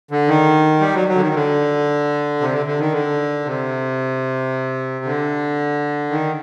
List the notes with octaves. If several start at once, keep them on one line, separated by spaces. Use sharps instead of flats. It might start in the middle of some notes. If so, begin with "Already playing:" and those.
D3
D#3
G3
F#3
F#3
D3
D#3
D3
C3
D3
D3
D#3
D3
C3
D3
D#3